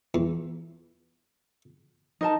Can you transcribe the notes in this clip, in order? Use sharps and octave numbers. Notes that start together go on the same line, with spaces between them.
E2
D#4 A#4 A5